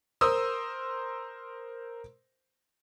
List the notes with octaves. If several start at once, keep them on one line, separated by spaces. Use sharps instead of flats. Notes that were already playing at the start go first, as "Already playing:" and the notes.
A#4 C5 C6 D#6 E6